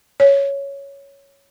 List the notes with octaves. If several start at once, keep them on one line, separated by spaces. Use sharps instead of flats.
C#5